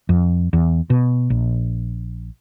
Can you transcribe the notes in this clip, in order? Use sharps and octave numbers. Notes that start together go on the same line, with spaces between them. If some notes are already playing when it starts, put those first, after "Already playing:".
F2
E2
B2
A#1